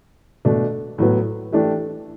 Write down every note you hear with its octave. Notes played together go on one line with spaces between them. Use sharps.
B2 A3 D4
A2 F#3 B3
E3 A3 D4 G4